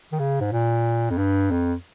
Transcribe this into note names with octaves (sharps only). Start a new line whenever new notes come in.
D#3
C#3
G#2
A#2
F2
G2
F2